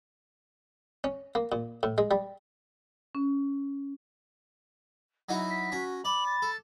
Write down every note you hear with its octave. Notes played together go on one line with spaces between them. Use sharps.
C#4
A#3
A#2
A2
G#3
G3
C#4
F#3 D#4 E4 F#4
B6
C#4 F#4 A#5
D5 B5 F#7
A6
A4